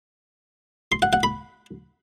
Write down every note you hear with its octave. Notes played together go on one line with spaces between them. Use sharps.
C6
F#5
F#5
B5